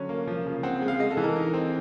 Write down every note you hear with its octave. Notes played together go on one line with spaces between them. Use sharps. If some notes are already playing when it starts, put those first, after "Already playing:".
Already playing: D3 F#3 C#4
A#3
F3
C#3
C4 F#5
G#3
F5
G#3 D#5
A4
E3
A#4
D#4
C4